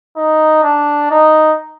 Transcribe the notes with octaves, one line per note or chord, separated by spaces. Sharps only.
D#4
D4
D#4